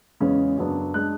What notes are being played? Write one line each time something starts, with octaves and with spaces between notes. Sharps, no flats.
E2 C#3 G#3 C#4
F#2 C#3 F#3 B3 D4
G#3 D4 F#6